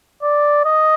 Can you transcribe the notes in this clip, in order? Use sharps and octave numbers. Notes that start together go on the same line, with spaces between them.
D5
D#5